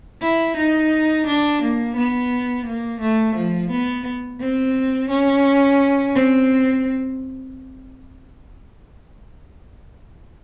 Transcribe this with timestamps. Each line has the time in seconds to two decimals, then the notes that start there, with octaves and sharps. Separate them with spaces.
0.22 E4
0.57 D#4
1.27 D4
1.62 A#3
1.97 B3
2.66 A#3
3.01 A3
3.36 F3
3.71 B3
4.41 C4
5.10 C#4
6.15 C4